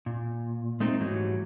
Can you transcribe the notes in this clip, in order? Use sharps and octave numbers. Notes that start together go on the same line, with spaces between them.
A#2
G#3 A3 C4 D#4
G#2 E3 F#3 G3 A3